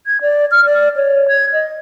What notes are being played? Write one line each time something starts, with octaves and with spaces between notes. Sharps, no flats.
G#6
D5
F6
D5
C#5
G#6
D#5